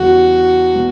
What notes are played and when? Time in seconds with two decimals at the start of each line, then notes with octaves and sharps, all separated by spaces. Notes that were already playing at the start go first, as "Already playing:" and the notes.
Already playing: E2 C#3 E3 G3 F#4
0.75 B2